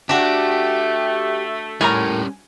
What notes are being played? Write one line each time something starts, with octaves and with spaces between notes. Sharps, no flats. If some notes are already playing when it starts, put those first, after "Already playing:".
A3 D4 F#4 G4
A2 G3 C#4 A#4 G#5 A#5